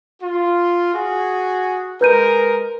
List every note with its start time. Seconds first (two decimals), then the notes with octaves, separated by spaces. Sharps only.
0.21 F4
0.93 F#4 G#4
2.01 G#3 A#4 B4 G6 D#7